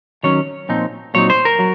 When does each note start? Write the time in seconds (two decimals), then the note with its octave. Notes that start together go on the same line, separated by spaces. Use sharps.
0.23 D#3 F#3 C#4 C#5
0.69 A#2 F3 C4 D#4
1.14 A#2 F#3 C4 D#4 C#5
1.30 C5
1.45 A#4
1.59 F#3